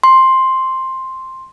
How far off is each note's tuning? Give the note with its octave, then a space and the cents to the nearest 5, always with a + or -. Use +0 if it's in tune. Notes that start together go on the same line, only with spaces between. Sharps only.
C6 +5